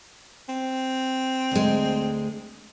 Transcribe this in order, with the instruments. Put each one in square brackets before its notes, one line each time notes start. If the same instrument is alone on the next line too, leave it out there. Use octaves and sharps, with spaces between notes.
[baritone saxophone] C4
[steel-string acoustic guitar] D2 G#3